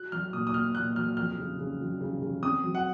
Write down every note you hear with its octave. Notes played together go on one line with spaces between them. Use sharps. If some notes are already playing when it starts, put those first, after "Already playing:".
Already playing: F#4 F#6
F#3 F6
A#2 D#6
D#6
A#2 F6
A#2 F#6
F#3 F6
F2 F6
C#3
C#3
F#3
C#3
C#3
C4 D#6
F#3
F#5